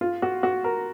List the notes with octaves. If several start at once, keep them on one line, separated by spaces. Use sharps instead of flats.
F4
F#4
F#4
A#4